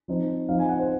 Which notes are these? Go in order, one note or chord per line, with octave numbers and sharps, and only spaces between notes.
F3 C4 D#4
F3 C4 D#4 F5
G#5
F#5
C5